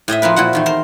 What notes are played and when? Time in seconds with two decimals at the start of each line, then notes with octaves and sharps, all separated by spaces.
0.08 A2 G#4 D#5 E5
0.22 F3 C4 A#4 B4
0.36 A#2 E4 F#4 F#5
0.53 E2 D#3 A3
0.66 A#4 C5